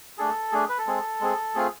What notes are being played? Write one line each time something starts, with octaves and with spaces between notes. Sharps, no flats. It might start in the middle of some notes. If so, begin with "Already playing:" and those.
A3 D4 G#4 A4
A3 D4 G#4
B4
A4
G#3 C4 G#4
G#3 C4 G#4
A3 C4 F4 G#4